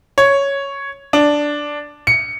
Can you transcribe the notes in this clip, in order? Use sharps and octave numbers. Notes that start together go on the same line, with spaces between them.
C#5
D4
C#7